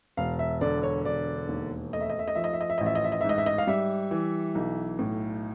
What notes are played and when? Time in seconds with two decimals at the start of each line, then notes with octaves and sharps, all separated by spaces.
0.17 E1 F5
0.39 E5
0.61 D3 D5
0.83 C#5
1.05 E1 D5
1.49 D#2
1.92 A3 D#5
2.01 E5
2.10 D#5
2.19 E5
2.28 D#5
2.35 F3 E5
2.44 D#5
2.53 E5
2.61 D#5
2.70 E5
2.78 A1 D#5
2.86 E5
2.95 D#5
3.04 E5
3.12 D#5
3.21 G#2 E5
3.29 D#5
3.38 E5
3.46 D#5
3.58 F5
3.67 G3 E5
4.11 E3
4.55 B1
4.99 A2